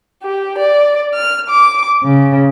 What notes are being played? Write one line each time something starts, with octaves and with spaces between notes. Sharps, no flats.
G4
D5
F6
D6
C#3